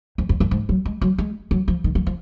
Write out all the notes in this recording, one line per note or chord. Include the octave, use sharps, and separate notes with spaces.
F2
F2
F#2
G#2
F#3
G#3
F#3
G#3
F#3
F3
D#3
F3
F3